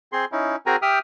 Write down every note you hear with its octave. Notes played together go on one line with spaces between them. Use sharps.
C4 G#4 C6
C#4 D#4 E4
C4 F#4 G#4 A#4 G#5 A#5
G4 E5 G5 D#6 F6